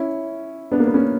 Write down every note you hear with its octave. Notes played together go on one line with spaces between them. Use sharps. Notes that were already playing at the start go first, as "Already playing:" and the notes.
Already playing: C#4 E4
B3 D4
A#3
B3
A#3 C#4